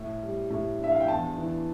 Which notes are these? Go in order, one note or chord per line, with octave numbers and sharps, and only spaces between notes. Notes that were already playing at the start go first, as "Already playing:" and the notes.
Already playing: A2
G3
A2
D4 E5
F5
G5
E2 A5
E3